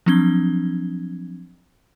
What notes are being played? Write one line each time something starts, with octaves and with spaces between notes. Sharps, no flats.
F3 F#3 C4 D4 G#6 G7